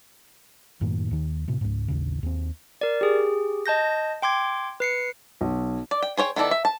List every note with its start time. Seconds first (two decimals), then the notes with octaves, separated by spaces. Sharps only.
0.81 F#2 A2 D#3 A#3
1.11 D#2 D#3
1.48 A2 C3
1.61 C#2 G#2
1.88 A1 D#2 C#3
2.23 D#2 C4
2.81 A#4 D5
3.01 G4 G#4
3.66 D#5 A5 G6 A#6
4.22 G5 C6 D6 G#6
4.80 B4 C7 C#7
5.41 B1
5.91 D5
6.02 G5
6.17 G#4 C5 C#5 G5
6.36 D#3 B3 E4 A4 D5
6.51 E5
6.65 A5